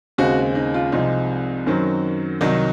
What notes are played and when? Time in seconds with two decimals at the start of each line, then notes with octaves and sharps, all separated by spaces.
0.18 D#2 C#3 G#3 C4 F#4
0.55 D#4
0.74 F4
0.92 C2 C3 F3 G#3 D#4
1.66 F#2 D#3 F#3 C4
2.41 C2 C3 D#3 F#3 D#4